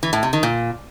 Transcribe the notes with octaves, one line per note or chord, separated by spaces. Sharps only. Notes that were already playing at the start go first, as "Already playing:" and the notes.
E3
A2
C3
D#3
A#2